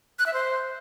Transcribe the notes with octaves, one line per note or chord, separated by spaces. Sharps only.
F#6
E5
C5